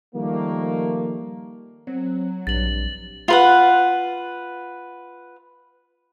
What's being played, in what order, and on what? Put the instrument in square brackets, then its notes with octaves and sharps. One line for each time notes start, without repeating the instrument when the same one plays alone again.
[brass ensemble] D#3 F3 G3 A3 A#3
[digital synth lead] F#3 [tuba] C4
[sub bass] A#1 [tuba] G2 [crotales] A6 F#7
[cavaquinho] F4 B4 F#5